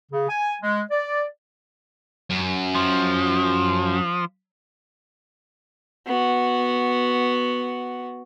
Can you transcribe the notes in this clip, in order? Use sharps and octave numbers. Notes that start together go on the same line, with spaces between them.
C#3
G#5
G#3
D5
F#2
F3
B3 F#4